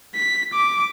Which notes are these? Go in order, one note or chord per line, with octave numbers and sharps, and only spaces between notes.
B6
D6